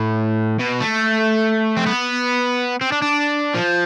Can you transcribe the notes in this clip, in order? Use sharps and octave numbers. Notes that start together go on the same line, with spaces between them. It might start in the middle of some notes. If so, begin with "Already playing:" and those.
Already playing: A2
B2
A3
C4
B3
C4
D4
D4
F3